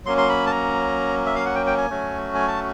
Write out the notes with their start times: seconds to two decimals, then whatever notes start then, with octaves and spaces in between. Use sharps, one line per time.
0.05 F#3 A#3 C#4 C6
0.18 C6
0.29 B5
0.47 A5
0.51 A#5
1.26 E5
1.35 F5
1.45 F#5
1.55 G5
1.66 G5
1.78 G#5
1.90 F#3 A3 C#4 F#4
2.35 G#5
2.48 A5